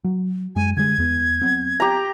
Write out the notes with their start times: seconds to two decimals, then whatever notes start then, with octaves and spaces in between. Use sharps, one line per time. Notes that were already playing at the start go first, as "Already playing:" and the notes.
0.04 F#3
0.56 F#2 G#3 G#5
0.77 D3 G3 G#3 G#6
0.98 E2 B3
1.42 F#3 B3 C4
1.80 G4 A#5